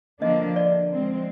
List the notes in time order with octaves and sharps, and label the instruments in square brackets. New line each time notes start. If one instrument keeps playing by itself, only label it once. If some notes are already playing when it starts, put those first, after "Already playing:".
[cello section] D3 F3 A#3 D4 [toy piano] D#5
[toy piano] D5
[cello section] F3 G#3 C4